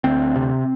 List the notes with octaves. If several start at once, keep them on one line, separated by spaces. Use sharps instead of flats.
D2 C4
C3